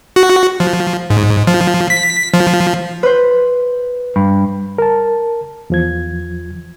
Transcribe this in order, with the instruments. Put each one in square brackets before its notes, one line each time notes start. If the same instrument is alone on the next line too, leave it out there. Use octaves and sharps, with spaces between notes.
[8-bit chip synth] F#4
F3
G#2
F3
B6
F3
[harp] B4 C5
[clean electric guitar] G2
[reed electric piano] A#4 A5
E2 F3 G#6